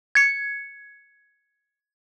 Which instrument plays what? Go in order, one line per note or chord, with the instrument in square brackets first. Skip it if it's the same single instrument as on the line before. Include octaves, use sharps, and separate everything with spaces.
[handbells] G#6 C#7